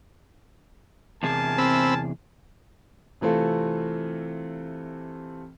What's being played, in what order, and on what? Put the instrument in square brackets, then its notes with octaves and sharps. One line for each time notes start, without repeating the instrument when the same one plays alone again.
[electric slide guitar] E2 C3 G#4 [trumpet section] A#4 G#5 A5
[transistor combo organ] C4 B5 E6
[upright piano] C3 E3 A3 C4 F4 A4